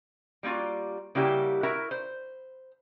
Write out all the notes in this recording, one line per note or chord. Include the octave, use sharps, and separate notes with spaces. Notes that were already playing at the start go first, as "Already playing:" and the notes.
G3 A#3 C#4 F4 F#4
C#3 G3 A#3 E4 F#4 G4
E4 F#4 A#4 E5
C5